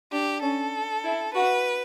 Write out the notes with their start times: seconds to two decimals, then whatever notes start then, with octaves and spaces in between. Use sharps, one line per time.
0.12 D4 G4
0.42 C#4 A4
1.05 E4
1.34 F#4 B4